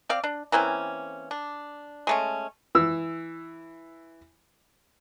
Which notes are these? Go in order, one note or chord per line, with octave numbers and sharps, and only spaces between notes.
C4 D5 F5
D4
E3 A#3 C4 C#4
D4
G#3 A3 C#4
E3 E6